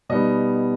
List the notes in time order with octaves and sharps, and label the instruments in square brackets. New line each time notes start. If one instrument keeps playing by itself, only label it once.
[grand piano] B2 G3 B3 D#4 D#5